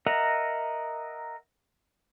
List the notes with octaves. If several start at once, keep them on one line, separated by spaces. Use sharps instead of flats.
A#4 D#5 E5 F#5 A#5